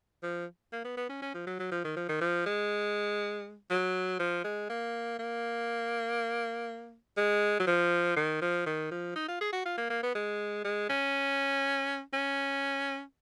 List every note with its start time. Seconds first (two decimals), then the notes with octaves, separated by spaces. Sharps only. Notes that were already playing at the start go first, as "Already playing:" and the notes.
0.23 F3
0.72 A#3
0.85 B3
0.97 B3
1.09 C#4
1.22 C#4
1.34 F3
1.47 F#3
1.59 F#3
1.71 F3
1.84 D#3
1.96 F3
2.09 D#3
2.21 F3
2.46 G#3
3.70 F#3
4.19 F3
4.44 G#3
4.69 A#3
5.19 A#3
7.17 G#3
7.60 F#3
7.67 F3
8.16 D#3
8.41 F3
8.66 D#3
8.91 F3
9.15 D#4
9.28 F4
9.41 G#4
9.53 F#4
9.65 F4
9.78 A#3
9.90 A#3
10.03 B3
10.15 G#3
10.64 G#3
10.90 C#4
12.13 C#4